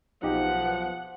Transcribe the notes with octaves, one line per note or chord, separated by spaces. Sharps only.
B1 F3 D#4 G4 F#5